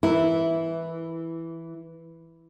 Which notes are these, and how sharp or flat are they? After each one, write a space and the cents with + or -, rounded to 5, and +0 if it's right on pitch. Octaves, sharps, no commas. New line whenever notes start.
E3 +0 E4 -5 A#4 -20